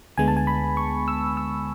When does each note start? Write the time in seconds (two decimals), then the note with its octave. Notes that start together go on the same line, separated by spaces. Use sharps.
0.17 D2 D3 G#3 B3 G#5
0.28 A5
0.37 G#5
0.47 B5
0.77 C#6
1.08 E6
1.37 E6